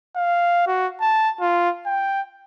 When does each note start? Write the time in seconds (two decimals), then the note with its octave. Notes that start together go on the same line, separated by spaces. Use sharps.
0.16 F5
0.67 F#4
1.01 A5
1.40 F4
1.86 G5